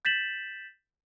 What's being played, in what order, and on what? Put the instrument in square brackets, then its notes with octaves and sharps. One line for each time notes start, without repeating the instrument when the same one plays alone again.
[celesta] G6 A6 B6 E7 F#7